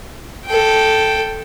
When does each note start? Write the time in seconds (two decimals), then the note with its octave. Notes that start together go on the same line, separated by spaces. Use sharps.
0.46 A4 G5